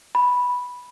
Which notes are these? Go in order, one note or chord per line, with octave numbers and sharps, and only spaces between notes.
B5